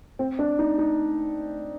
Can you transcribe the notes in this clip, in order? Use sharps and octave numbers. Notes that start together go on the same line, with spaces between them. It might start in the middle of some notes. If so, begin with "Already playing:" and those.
C4
D4
D#4
D#4